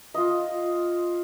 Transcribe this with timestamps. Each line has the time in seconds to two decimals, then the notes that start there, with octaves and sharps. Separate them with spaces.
0.14 F4 D#5